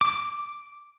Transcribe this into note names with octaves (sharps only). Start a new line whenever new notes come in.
D6